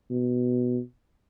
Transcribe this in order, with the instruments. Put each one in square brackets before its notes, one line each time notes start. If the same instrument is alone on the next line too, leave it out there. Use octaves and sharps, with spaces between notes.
[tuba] B2